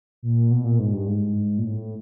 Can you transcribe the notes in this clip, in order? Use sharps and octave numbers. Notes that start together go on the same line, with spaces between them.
A#2
B2
A#2
G#2
G2
G#2
A#2
A2